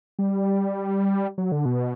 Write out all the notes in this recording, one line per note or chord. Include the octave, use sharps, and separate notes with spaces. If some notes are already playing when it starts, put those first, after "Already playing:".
G3
F#3
D3
B2